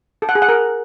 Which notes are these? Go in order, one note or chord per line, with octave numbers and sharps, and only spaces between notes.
A4
F#5
G#4
F#5
A#4